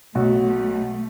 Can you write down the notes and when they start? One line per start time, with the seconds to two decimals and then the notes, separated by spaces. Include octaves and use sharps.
0.15 B1 A3 F#4